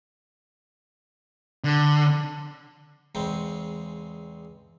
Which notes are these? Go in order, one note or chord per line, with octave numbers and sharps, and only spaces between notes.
D3
E2 C#3 G#3 C4